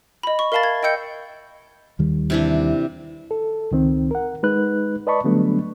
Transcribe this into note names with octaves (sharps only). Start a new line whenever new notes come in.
D#5 B5
C#6
A#4 E5 F5 A5 B5 A6
G#6
D#5 G5 E6 G6 C#7
D#2 D#3 G3
C3 E3 D4
A4
C#2 D#3 C4
A#4 F#5
G#3 D#4 B4 F#6
B4 D5 D#5 A5 B5 C#6
D3 F#3 G3 A3 B3 D4